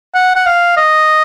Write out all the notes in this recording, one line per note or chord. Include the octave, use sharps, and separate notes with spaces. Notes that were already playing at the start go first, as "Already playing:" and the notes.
F#5
F#5
F5
D#5